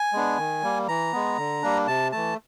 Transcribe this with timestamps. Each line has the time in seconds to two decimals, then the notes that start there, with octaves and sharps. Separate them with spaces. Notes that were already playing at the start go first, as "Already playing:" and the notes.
Already playing: G#5
0.13 G#3 B3 D4
0.38 D#3
0.63 G3 A#3
0.88 E3 A#5
1.13 G#3 B3
1.38 D3
1.62 G3 A#3 D4
1.87 C3 A5
2.12 E3 A3 A5